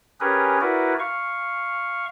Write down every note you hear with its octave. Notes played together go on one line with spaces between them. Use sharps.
C#4 G4 G#4 A#4 B4
E4 F#4 A#4 B4 D5
F5 C#6